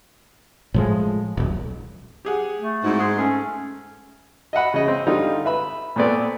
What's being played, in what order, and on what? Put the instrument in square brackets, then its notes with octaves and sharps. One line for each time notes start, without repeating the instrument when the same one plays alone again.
[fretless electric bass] A2 F3 G#3
D#1 B1
[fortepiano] G4 G#4 F#5
[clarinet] A3
[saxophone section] G#2 [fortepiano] C4 E4 F#4
[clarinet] G#4 [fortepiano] F#5 C6
[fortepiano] A3 [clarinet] C#4
[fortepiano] D#5 E5 F#5 B5
C#3 D#5
C4
D3 G3 D#4 F4
B4 E5 B5
A#2 A3 B3 C4 D5